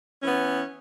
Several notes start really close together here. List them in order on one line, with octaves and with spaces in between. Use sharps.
C#4 E3 B3